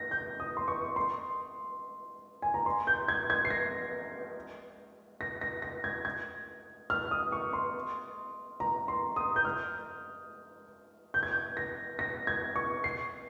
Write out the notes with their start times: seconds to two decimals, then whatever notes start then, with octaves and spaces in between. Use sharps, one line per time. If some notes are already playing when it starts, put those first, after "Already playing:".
Already playing: A#6
0.11 G6
0.40 D#6
0.57 C6
0.68 C#6
0.96 C6
2.42 G#5
2.54 A#5
2.66 C6
2.87 G6
3.08 G#6
3.30 G#6
3.45 C7
3.50 A#6
5.21 A#6
5.41 A#6
5.62 A#6
5.84 G#6
6.05 G#6
6.90 F6
7.11 D#6
7.32 C#6
7.53 C6
8.60 A#5
8.88 C6
9.16 D#6
9.36 G6
9.45 F6
11.14 G6
11.23 G#6
11.31 G6
11.57 A#6
11.99 A#6
12.27 G#6
12.56 C#6
12.84 C7